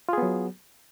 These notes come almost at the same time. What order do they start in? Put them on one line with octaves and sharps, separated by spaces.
F4 G#4 B3 F#3